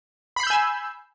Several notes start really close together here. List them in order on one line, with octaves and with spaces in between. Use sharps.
B5 C7 G6 E6 G#5